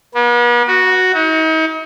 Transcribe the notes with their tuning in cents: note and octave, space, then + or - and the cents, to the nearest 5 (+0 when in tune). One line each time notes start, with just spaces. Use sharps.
B3 -45
F#4 +0
D#4 +40